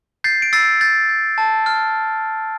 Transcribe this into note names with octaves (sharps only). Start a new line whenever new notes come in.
G6 A6 C7
D7
E6 A6 C7
G6 A6
G6
A5
F6